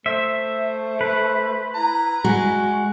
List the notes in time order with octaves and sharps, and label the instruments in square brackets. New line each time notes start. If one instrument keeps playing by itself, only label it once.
[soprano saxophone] A3 [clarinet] C5 [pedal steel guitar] E5
[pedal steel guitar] B4
[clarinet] E4 [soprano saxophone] A#5
[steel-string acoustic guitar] G#3 [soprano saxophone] F#4 [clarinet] F#5